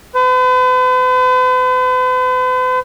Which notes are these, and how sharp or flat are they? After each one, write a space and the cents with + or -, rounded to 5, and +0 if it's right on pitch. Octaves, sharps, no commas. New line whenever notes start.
B4 +45